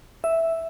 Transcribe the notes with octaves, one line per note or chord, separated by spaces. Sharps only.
E5